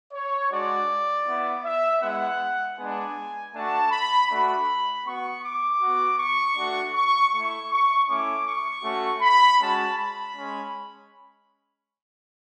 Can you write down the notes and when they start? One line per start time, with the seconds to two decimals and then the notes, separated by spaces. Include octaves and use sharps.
0.13 C#5
0.51 G#3 D4 F#4 D5
1.26 B3 E4
1.64 E5
2.02 G#3 B3 E4 F#5
2.78 G#3 B3 D4 G#5
3.54 A3 D4 F#4 A5
3.91 B5
4.29 A3 D4 F#4 B5
5.05 B3 F#4 C#6
5.43 D6
5.81 B3 F#4
6.19 C#6
6.56 A3 D4 F#4
6.95 C#6
7.32 A3 E4 C#6
7.70 C#6
8.08 A3 C#4 E4 D6
8.46 C#6
8.84 A3 C#4 F#4
9.22 B5
9.60 G#3 C#4 F#4 A5
9.97 B5
10.36 G#3 C#4